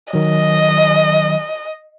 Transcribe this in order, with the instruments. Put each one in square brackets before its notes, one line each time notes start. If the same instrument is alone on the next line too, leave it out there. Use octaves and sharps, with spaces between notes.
[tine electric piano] D#3 F#3 [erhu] D#5